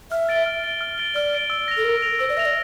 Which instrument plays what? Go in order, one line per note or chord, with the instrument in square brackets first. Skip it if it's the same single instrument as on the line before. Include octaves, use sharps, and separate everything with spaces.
[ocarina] E5 [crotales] F6
[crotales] A6 D7 G7
F6
A6 D7 G7
F6
A6 D7 G7
[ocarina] D5 [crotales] F6
[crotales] A6 D7 G7
E6
A#6 F7
[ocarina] A4
[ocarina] A#4 [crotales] E6
[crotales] A#6 F7
[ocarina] C5 [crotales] E6
[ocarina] D5
[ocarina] E5 [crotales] A#6 F7
[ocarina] D5